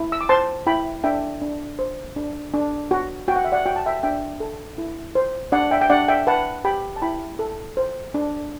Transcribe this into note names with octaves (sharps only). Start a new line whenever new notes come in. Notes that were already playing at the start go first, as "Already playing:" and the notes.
Already playing: E4
E6
D6
C5 A5 C6
E4 G5 B5
D4 E5 G5
D4
C5
D4
D4
F#4
F#4 G5
F#5
E5
D5 F#5
F#4 G5
A5
E5 G5
D4 E5 G5
A4
E4
C5
D4 D5 F#5
E5 G5
G5
D4 D5 F#5
E5 G5
B4 F#5 A5
G4 G5 B5
A5
E4 G5 B5
A4
C5
D4